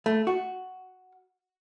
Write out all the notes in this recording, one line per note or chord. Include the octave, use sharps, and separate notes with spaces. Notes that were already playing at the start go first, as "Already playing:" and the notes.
A3
F#4